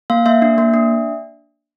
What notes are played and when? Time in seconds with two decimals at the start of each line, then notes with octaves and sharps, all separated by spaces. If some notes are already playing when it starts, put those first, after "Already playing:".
0.10 A#3 F5
0.26 A#3 E5
0.42 D4
0.58 A#3
0.74 D4